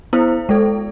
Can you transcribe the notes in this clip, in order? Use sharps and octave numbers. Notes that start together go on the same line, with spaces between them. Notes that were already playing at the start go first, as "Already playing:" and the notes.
B3 E4 C5
G#3 A4